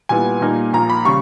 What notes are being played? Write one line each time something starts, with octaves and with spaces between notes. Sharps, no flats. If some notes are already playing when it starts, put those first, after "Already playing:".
A#2 G3 B3 E4 G#5
A#2 G3 A#3 D#4
A#1 A#2 A#3 A#5
B5
C#3 G3 C#6